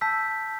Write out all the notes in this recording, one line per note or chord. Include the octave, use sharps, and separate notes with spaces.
A5 E6 G6 B6